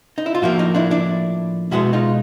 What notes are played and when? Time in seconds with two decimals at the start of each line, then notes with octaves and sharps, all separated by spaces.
0.18 D#4
0.26 E4
0.35 F4
0.42 A2 F3 A#3 E4 F#4
0.59 D#4 F4
0.75 D4 E4
0.91 D4 E4
1.71 B2 G#3 B3 E4 F#4
1.93 D#4 F4